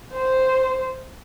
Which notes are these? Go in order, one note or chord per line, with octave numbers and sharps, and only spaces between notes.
C5